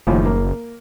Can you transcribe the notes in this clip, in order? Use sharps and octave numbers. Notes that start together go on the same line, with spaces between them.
F#1 D#2 A2 F3
A#3